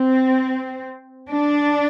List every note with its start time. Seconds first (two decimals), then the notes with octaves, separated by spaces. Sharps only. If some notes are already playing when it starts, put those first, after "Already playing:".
Already playing: C4
1.29 D4